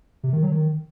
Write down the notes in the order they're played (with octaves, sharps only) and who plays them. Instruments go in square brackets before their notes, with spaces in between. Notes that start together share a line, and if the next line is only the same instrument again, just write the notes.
[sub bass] C3
D#3
F#3
D#3